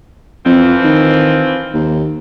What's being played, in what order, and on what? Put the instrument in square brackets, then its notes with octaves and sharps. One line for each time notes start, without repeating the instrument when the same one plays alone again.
[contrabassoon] F2 [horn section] E3 F3 C4
[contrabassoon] D#3
D#2